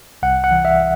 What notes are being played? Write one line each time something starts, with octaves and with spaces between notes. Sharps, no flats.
C2 F#5
F#5
E3
E5